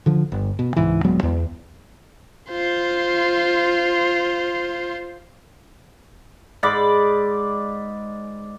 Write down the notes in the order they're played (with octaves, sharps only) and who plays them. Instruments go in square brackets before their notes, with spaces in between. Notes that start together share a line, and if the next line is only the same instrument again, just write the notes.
[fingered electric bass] D3 F3
G1
B2
C#2 G#2 E3
D#1 F#3 G#3 B3
E2
[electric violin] F4 C5
[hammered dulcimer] G#2 D5 B5 D6